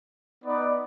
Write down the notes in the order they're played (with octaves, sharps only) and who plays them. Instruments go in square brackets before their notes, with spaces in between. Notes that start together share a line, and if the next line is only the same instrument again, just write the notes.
[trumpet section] B3 D#4 B4 D5